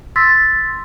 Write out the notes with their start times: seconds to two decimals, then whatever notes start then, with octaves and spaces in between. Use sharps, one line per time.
0.16 C6 E6 A6 B6